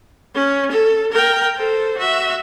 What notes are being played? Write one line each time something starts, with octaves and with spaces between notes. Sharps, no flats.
C#4
A4
A#4 G5
A4 C5
F#4 E5